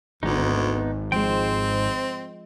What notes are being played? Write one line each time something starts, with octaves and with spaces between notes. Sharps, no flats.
G#1 D2 B3 D#4
F3 G#3 C4 C5 G5